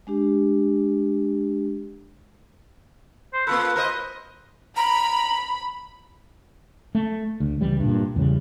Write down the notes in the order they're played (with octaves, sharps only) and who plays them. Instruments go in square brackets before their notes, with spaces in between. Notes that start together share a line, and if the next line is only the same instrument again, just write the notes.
[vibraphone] G#3 D4 G4
[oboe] C5
[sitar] A#3 F4 A4 [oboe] B4
[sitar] A#4 C5 D#5
[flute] A#5 [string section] B5
[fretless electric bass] A3
D2
C#2 E3 G3
G2 A#2
E2 C#3 G3